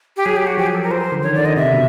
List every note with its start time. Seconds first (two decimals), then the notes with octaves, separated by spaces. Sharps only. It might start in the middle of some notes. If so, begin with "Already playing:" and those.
0.17 G4
0.25 F#3 G#4
0.36 G4
0.47 F#4
0.58 F3 G4
0.66 G#4
0.74 A4
0.83 A#4
0.90 F3 C5
1.12 D3
1.23 C#5
1.26 D#3
1.35 D5
1.38 D3
1.46 D#5
1.57 C3 E5
1.73 B2